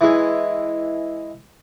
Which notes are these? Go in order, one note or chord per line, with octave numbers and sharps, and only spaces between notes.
E3 G#3